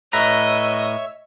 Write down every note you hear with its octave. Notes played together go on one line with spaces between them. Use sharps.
A2 B4 C#5 D#5 E5 A#5